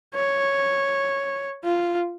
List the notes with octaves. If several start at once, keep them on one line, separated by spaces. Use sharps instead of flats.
C#5
F4